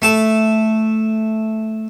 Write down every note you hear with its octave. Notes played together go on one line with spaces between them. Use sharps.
A3 A5